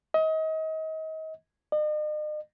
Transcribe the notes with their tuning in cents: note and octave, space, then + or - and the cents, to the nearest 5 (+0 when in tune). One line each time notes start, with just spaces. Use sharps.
D#5 +30
D#5 -45